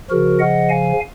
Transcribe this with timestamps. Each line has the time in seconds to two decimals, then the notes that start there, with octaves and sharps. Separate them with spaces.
0.10 C#3 F3 F#4 A#4
0.40 D#5 F#5
0.69 F5 G#5